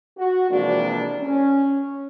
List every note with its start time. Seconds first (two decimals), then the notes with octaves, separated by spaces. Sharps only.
0.18 F#4
0.50 C3 E3 F3 G#3 A#3 D4
1.21 C#4